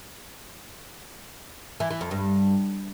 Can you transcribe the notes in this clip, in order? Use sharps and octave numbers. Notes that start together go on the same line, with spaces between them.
E3
E3
F2
G2